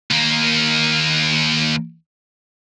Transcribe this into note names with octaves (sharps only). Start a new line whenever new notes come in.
D#2 A#3